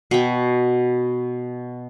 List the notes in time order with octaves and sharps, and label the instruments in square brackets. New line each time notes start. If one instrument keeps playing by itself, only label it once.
[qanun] B2 G5